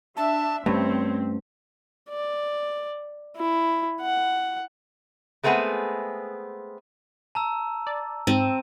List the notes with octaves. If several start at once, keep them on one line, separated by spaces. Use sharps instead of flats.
D4 E5 A5
G2 A3 C4 C#4 C#5
D5
E4
F#5
G#3 A3 B3 C4 G#4 F#5
A5 A#5 E6
D5
G#2 C4 D#7